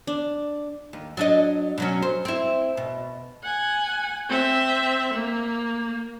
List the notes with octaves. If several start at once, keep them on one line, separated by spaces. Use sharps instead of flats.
D4
D#2
F#3 D4 D#5
B2 F#3 C#4
C5
C4 E4
B2
F#5 G#5
C4 E5
A#3